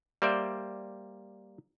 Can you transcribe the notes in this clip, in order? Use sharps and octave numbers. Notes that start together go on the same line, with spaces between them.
G3 A#3 C5 D5 E5 G5